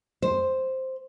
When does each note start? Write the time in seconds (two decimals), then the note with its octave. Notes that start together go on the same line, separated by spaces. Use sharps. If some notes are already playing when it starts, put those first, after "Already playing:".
0.22 C5